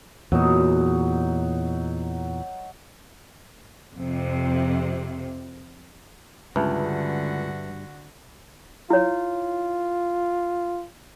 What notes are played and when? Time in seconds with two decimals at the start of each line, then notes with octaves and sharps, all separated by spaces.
0.32 E2 A#2 F#3 D#4
3.95 F2 C3
6.56 C#2 G2 D3 F#4 B4 E5 A5
8.90 E4 F4 C#5